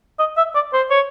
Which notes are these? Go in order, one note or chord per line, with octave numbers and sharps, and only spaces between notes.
D#5
E5
D5
C5
C#5